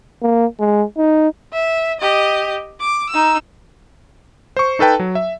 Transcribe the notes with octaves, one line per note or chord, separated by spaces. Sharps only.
A#3
G#3
D#4
E5
G4 D#5
D6
D#4 E6
C5 C#6
D#4 A4 B4 G5 A5
F#3
E5